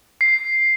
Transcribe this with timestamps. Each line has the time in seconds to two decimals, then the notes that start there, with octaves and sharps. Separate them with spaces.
0.21 C7